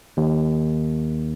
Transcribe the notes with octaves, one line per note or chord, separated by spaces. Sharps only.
D#2